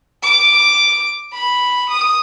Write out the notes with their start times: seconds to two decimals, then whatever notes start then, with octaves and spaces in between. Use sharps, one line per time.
0.23 D6
1.33 B5
1.90 D#6